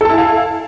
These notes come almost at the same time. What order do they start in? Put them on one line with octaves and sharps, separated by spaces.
A4 A5 E4 G#5 F5